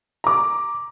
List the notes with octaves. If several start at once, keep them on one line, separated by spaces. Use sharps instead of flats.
A#5 D6